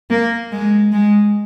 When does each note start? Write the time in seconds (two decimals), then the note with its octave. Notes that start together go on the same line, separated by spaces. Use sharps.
0.10 A#3
0.52 G#3
0.92 G#3